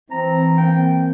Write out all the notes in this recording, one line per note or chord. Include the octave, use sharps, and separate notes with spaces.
E3 C4 A#5
A#3 C4 G5